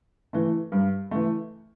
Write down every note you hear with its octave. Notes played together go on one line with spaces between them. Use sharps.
E3 A3
G2
E3 A3